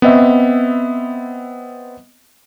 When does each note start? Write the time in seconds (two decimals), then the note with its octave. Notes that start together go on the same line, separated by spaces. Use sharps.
0.02 B3 C4 D#5 E5